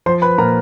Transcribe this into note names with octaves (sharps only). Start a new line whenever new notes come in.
F3 C5 C6
B4 B5
A#2 A#4 A#5